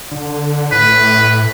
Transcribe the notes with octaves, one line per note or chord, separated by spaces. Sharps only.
D3
A2 B4